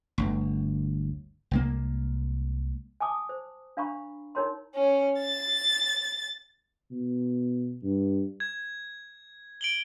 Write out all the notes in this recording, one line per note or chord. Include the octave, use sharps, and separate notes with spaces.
G1 D2
C2 G#3 A#3
G#5 A5 D6 D#6
C5
D4 F5 A#5 B5 C#6
D#4 A#4 C#5 A#5 C6
C#4
A6
B2
G2
G#6
D7 F#7 G7